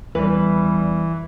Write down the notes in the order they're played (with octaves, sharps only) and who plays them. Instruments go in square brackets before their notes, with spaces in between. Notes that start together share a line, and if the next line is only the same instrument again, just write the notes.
[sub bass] E2 [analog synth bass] E3 [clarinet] G3 [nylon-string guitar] B4